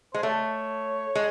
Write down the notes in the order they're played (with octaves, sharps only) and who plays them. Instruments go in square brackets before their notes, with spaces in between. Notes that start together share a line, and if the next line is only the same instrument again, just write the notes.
[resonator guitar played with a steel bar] G#3 [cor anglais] C5
[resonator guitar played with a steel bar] A3 [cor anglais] C#5
[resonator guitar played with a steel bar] G#3